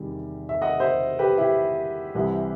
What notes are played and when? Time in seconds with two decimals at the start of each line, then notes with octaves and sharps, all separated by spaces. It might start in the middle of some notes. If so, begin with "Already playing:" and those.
Already playing: E2 C3 D#3 G3
0.49 E5
0.62 D#5 F#5
0.80 C5 E5
1.19 G4 B4
1.38 E4 G4
2.15 C2 C3 E3